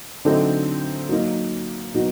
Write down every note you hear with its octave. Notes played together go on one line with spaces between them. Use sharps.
D3 F#3 A3 C4 D#4
F#3 A#3 D#4
B2 F#3 B3 D#4 F#4